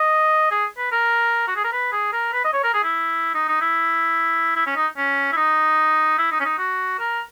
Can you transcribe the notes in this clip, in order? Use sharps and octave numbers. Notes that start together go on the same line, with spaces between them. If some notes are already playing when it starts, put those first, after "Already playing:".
Already playing: D#5
G#4
B4
A#4
F#4
G#4
A#4
B4
G#4
A#4
B4
D#5
C#5
A#4
G#4
E4
D#4
D#4
E4
E4
C#4
D#4
C#4
E4
D#4
E4
D#4
C#4
D#4
F#4
A#4